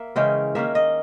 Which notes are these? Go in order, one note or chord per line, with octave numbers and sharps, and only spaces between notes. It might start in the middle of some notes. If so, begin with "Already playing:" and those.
Already playing: A#3 E5
C#3 E3 G#3 C#4 G5
D#3 A#3 C#4 E5
D#5